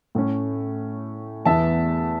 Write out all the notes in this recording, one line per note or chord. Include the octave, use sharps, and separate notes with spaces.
A2 A3 C#4
E2 E3 B3 E5 A5